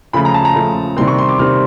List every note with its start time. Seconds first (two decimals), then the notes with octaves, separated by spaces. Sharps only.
0.13 C#3 F3 A3 B5
0.25 A#5
0.34 A5
0.45 A#5
0.56 C#3 F3 A3
0.96 C3 D#3 G3 C4 C6
1.07 C#6
1.18 C6
1.29 D6
1.39 C3 D#3 G3 C4 F6